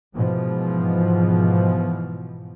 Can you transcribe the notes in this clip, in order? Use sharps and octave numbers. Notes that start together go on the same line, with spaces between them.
G#2 B2 E3 F3